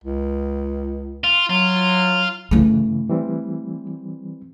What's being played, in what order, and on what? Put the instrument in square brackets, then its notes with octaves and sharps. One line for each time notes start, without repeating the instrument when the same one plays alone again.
[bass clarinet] C#2
[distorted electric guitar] F4
[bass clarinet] F#3 [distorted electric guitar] F4
[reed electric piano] G2 C#3 E3 [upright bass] A3 E4
[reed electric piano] E3 G3 C4